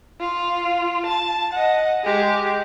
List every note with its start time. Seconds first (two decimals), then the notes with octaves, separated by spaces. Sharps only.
0.20 F4
1.06 A5
1.53 D#5 F#5
2.04 G#3 G4